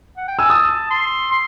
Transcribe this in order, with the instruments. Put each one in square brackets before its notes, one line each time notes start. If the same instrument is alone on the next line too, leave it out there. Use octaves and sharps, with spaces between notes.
[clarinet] F#5
G5
[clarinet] G#5 [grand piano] E6
[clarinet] A5 [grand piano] D#6
[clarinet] C6
C6